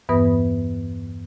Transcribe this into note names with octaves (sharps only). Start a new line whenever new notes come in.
E2 G2 E3 B3 B4 D#6